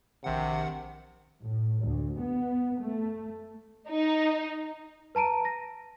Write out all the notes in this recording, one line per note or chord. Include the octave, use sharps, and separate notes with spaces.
A#1 C3 D#3 F#5
A2
D2
B3
A3
D#4
B4 A5 A#5 D7 D#7
A#6